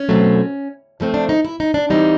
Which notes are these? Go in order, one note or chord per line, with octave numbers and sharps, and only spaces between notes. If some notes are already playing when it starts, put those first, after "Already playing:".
Already playing: C#4
B2 F#3 A3 C4
C#3 F3 A3 C4
D4
D#4
E4
D#4
D4
E3 G3 C4 D#4